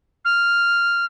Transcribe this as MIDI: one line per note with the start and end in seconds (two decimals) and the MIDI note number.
0.25 1.05 89